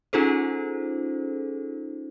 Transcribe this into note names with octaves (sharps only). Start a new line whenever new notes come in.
C#4 D#4 F4 G#4 A4 C5